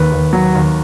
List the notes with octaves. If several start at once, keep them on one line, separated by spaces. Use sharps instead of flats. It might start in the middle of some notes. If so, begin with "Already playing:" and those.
Already playing: D#2 B4
D#2
F#3
D#2